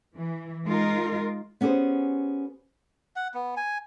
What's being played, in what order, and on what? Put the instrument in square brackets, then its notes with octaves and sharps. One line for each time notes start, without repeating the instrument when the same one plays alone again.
[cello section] E3
G#3 D#4 F4 A#4
[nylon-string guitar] B3 C#4 G4 G#4 C5
[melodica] F#5
B3
G#5